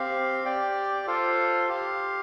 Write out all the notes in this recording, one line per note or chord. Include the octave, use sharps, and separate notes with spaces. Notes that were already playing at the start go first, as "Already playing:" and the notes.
Already playing: C4 G4 F5
G4 D5 G5
F4 A4 C5 F5
G4 F5